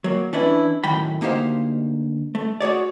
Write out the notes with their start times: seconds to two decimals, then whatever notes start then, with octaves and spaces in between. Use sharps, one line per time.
0.04 F#3 A#3
0.33 E3 C#4 D4 E4 B4
0.84 F#2 A2 D#3 G5 B5
1.21 D2 A#3 D#4 G4 C5 F5
2.35 A3
2.61 F#4 G#4 C#5 D5